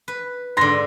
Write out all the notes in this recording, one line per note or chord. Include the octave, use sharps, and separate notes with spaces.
B4
G#2 D3 C6 A#6